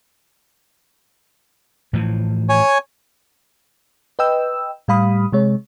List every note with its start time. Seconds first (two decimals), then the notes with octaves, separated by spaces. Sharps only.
1.93 A2 E3 F3
2.49 C#5 G#5
4.19 B4 D#5 G5 E6
4.88 A2 G3 F5 B5 D#6
5.32 C3 G#3 C#5